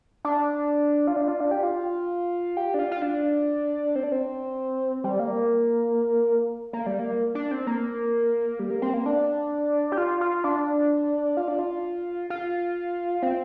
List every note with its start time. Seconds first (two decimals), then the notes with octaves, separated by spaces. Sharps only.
0.25 D4
1.07 F4
1.17 D4
1.28 F4
1.40 D4
1.51 G4
1.63 F4
2.57 G4
2.74 D4
2.79 F4
2.91 F4
3.02 D4
3.96 C4
4.03 D4
4.12 C4
5.04 G3
5.19 A#3
6.73 A#3
6.86 G3
6.99 A#3
7.35 D4
7.51 C4
7.67 A#3
8.59 G3
8.70 A#3
8.82 C4
8.94 A#3
9.06 D4
9.92 G4
9.98 F4
10.21 F4
10.44 D4
11.37 F4
11.48 D4
11.59 F4
12.30 F4
13.23 C4